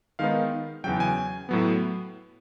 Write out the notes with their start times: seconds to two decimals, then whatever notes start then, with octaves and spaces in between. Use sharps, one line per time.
0.19 D#3 G#3 B3 D#4 F5
0.84 E2 C#3 F#3 G5
1.00 G#5
1.49 A2 F#3 B3